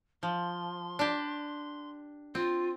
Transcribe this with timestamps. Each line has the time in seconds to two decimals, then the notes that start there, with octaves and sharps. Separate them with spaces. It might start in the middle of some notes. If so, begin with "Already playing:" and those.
0.23 F3 C6
0.99 D4 G4
2.35 C4 F4